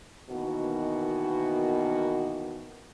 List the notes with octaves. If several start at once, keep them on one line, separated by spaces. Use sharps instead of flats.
B2 D#3 E3 A#3 B3 F#4